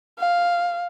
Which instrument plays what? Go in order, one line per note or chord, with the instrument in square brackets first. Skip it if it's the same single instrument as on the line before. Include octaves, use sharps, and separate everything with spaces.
[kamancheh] F5